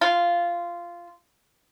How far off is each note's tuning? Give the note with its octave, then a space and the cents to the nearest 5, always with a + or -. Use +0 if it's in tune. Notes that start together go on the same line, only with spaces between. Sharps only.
F4 -10